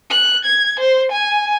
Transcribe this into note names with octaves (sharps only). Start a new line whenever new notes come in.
F#6
G#6
C5
G#5